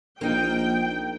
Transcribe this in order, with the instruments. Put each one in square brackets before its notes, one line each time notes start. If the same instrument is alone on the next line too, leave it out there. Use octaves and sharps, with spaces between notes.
[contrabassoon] A#1 [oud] A#3 D#4 [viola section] G5